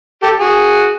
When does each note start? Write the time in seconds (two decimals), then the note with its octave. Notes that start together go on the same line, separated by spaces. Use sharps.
0.23 G4 A4
0.40 F#4 G#4